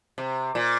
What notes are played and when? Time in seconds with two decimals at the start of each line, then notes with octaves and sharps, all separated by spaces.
0.18 C3
0.55 A#2